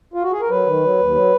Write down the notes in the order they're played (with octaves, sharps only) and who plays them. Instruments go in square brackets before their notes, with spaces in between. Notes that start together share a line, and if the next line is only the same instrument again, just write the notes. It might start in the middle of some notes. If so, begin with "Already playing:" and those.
[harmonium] F4
F#4
G#4
A#4
F#3 B4
D#3
F#3
D#2
F#3